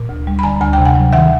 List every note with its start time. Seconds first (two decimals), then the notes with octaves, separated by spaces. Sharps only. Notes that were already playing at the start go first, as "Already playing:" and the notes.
Already playing: A#2
0.09 D2
0.27 G3
0.39 B5
0.43 D3 G#5 A#5
0.61 D2 G#5
0.73 C3 G5
0.85 F#5 G#5
0.95 F#3
1.13 D#3 E5 F#5